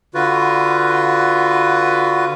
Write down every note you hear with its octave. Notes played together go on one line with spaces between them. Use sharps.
D3 F4 F#4 B4